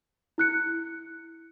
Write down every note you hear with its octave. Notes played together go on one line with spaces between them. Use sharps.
E4 F#6 C#7